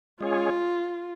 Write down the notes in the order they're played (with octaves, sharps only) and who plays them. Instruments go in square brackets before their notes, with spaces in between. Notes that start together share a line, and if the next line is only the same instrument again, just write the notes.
[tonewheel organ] G#3 C#4 G#4 C#5 [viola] F4